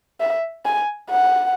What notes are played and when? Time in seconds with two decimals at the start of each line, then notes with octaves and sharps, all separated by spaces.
0.20 E5
0.65 G#5
1.10 F#5